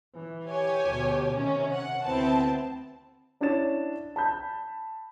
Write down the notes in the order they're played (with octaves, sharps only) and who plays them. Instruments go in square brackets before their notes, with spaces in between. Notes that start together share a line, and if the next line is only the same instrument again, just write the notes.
[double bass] E3
[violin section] G4 C#5 G#5
[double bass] D2 B2
[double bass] C3 D#3 [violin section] C#4
[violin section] F#5
[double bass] D2 E4 [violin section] B3 C4 A5
[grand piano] C#4 D4 E4 C#5 A6 E7
A5 B5 G6